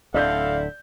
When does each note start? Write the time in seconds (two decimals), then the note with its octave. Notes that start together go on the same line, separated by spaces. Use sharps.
0.14 D1 D3 C4 E4 A4 D5 F5 G6